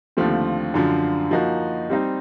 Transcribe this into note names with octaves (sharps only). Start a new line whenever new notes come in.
D#2 D3 F3 A3 C4
F#2 D3 F3
F3 A#3 D#4 F#4
G3 C4 D#4